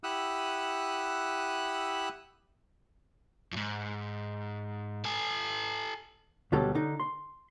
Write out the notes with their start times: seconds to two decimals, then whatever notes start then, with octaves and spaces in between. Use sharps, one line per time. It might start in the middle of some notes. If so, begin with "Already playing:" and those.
0.04 E4 G4 F#5 D#6 E6 F#6
3.52 F2 G#2
5.05 A4 G#5
6.52 D2 B2 F#3 G3 A4
6.75 D3 D#4
7.00 C6